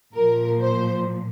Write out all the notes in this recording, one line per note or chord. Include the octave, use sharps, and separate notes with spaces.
A#2 F3 A#4
C5